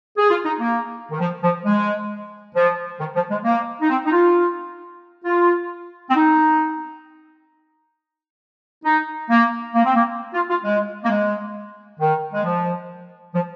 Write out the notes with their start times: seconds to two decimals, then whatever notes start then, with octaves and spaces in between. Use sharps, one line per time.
0.18 G#4
0.30 F4
0.45 D#4
0.60 A#3
1.11 D#3
1.20 F3
1.42 F3
1.65 G#3
2.55 F3
3.00 D#3
3.15 F3
3.31 G#3
3.44 A#3
3.81 D#4
3.90 C4
4.05 D#4
4.12 F4
5.25 F4
6.10 C4
6.15 D#4
8.84 D#4
9.30 A#3
9.75 A#3
9.85 C4
9.95 A#3
10.34 F4
10.50 F4
10.64 G#3
11.04 A#3
11.09 G#3
12.00 D#3
12.34 G#3
12.44 F3
13.34 F3